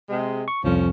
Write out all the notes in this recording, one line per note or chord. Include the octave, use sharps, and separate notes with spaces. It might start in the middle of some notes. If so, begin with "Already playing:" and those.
C3 G#3
C#6
C2 F2 F3 C#4